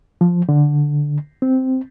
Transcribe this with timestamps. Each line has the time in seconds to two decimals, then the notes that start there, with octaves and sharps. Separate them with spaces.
0.21 F3
0.49 D3
1.42 C4